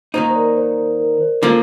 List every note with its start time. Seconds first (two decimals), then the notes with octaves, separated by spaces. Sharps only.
0.14 D#3 A#3 D#4 C5
0.30 C5
0.35 A#4 D5
0.57 C5
0.78 A#4
1.00 A#4
1.14 A#4
1.21 C5
1.43 D3 F3 A#3